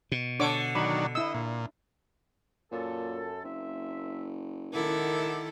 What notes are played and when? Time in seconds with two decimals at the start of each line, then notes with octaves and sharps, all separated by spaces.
0.12 B2
0.40 D3 D4 C#5 D6
0.75 D#3 F#3 D4 B5
1.15 E4 D#5 E6
1.34 A#2
2.71 F#2 A#2 A4
3.44 F#1 A#3 C4 E5
4.74 C#2 D#3 E4 A4 A#4 F#5 D6